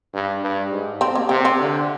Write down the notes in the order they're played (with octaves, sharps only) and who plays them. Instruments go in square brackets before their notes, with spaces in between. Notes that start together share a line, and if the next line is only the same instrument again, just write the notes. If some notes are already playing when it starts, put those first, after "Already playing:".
[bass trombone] G2
G2
G#2
[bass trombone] C3 [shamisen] C4
[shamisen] A#3
[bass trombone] C3 [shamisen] C4
[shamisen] C4
[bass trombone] D3